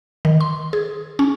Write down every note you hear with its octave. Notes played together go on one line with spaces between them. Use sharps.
D#3
C6
G#4
C#4